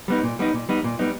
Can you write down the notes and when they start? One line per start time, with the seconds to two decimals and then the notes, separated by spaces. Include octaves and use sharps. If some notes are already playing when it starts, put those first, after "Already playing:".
0.08 G3 B3 D#4
0.23 A#2
0.39 G3 B3 D#4
0.54 A#2
0.69 G3 B3 D#4
0.84 A#2
0.99 G3 B3 D#4